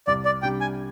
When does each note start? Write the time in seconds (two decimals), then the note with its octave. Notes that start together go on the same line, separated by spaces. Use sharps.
0.07 C2 D5
0.25 D5
0.43 C3 G3 D4 G5
0.61 G#5